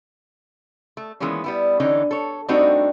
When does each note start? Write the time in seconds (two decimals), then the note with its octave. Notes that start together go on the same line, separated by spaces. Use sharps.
0.97 A3
1.20 D#3 E3 G#3 A#3 B3 C#4
1.44 G3 B3 E4
1.80 D3 E3 C#4 D#4
2.11 A4 C#5
2.48 G3 A3 C4 D4 D#4 F#4